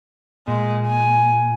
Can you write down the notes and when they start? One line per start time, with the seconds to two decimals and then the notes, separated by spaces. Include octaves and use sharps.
0.48 A#2 G#3
0.87 G#5